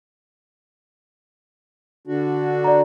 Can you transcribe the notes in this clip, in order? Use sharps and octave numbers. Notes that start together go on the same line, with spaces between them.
D3 D4 F#4
D5 A#5